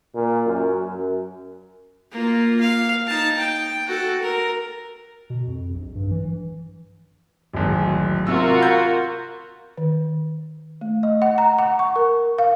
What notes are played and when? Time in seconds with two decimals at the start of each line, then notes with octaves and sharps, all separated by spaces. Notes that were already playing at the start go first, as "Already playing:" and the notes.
0.15 A#2
0.46 F#2
0.87 F#2
2.11 A#3 F4
2.61 F5
3.07 D#4 A5
3.37 G5
3.86 F#4 A4
4.22 A#4
5.30 B2
5.47 F2
5.74 A#1
5.95 G2
6.11 E3
7.53 D1 G#1
8.27 C3 F4 F#4 A#4 E6
8.59 F5 B5 G6
9.78 D#3
10.81 A3
11.03 D#5
11.22 F#5
11.38 A#5
11.59 F#5
11.79 C#6
11.96 A#4
12.38 F5